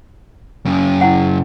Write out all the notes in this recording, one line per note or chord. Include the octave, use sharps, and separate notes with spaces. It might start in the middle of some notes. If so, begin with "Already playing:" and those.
F#2 C#3
E4 F#5